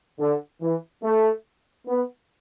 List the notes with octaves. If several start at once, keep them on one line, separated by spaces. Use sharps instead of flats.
D3
E3
A3
B3